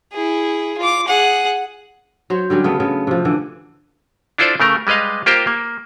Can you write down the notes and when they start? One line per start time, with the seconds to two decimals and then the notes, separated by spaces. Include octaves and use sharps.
0.13 E4 G#4
0.78 F4 D6
1.08 G#4 F#5
2.30 F#3 C5 C#5
2.50 D3 F#3 G3 C#4
2.64 C#3 A3 B3 B4
2.80 C#3 B3
3.07 C3 F3
3.25 D3 E3 F#5
4.38 D4 E4 F4 A4 C5 D5
4.60 C#3 A3 A#4
4.87 G3 G#3 B4 D#5 F5
5.26 A#3 F4 G4 A#4 C5 G5
5.47 A#3